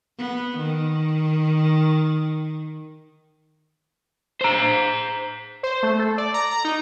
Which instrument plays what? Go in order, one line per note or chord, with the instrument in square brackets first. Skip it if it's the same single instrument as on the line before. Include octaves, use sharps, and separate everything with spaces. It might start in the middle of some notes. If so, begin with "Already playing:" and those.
[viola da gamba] B3
D#3
[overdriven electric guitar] C5 A#5
[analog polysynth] C5
A3
A4
D5
A#5
A#5
D#4